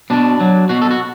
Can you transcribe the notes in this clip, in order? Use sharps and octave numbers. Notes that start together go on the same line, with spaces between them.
B2 D4
F#3
B2 F#4
A4
F#4